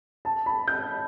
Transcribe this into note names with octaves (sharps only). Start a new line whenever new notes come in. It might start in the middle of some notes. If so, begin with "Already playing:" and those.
A5
B5
G6